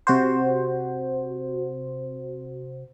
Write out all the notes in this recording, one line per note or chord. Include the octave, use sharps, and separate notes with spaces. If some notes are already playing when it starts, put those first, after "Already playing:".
C3 F#4 C5